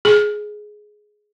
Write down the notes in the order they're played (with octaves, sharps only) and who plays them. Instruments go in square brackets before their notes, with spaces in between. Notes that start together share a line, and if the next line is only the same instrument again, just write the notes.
[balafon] G#4